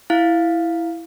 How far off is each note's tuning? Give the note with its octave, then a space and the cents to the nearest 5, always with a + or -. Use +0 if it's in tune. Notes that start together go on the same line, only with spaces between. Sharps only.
E4 +5 F5 +0